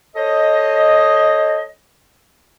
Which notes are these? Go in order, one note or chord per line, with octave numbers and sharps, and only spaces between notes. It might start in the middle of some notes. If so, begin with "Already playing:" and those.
A4 C5 C#5 D#5